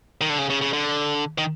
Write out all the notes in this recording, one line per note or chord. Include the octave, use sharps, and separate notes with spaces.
D#3
D3
C#3
C#3
C#3
D3
D#3